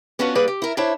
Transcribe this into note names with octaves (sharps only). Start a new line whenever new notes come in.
B3 C#4 D4 F4 F#4 B4
G3 A#3 G#4 B4 D5 F#5
G4
E4 A#4
D4 E4 C5 C#5 E5